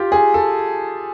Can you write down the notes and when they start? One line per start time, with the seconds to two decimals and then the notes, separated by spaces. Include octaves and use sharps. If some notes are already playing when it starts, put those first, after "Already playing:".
Already playing: F4 G4
0.12 G#4
0.34 A4